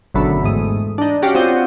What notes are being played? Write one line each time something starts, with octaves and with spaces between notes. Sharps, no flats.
G#1 F#2 B2 D3 A3 B5
E2 G#2 A3 D#6
D4 D#4
C#4 F#4 G4 D5 F5
C4 F4 F#4 D#6 G6